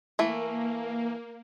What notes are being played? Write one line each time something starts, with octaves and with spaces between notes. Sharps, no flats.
E3 A3 A#3